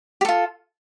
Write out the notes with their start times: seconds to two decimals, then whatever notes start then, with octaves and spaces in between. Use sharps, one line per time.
0.21 G4
0.25 A4
0.28 F4